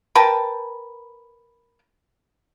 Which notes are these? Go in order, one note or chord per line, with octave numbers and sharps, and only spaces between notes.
A#4 B4 G5 A5